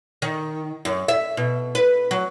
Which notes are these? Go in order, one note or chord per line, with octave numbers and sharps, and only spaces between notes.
D#3
F#2
E5
B2
B4
F#3